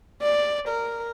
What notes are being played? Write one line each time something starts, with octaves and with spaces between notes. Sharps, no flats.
D5
A#4